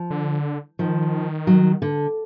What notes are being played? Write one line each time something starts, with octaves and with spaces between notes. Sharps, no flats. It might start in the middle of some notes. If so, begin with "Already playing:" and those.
Already playing: F3
D3
D#3 F3
F#3
D3